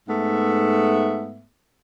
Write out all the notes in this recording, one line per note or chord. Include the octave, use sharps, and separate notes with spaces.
G#2 A3 B3 E5